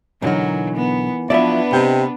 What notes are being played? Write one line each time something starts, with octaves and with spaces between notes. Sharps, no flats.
B1 D3 E3 F#3 D#4 A#4
B3
F3 F#3 B3 D4 E4 B4 D5 E5
C3 D#5 G5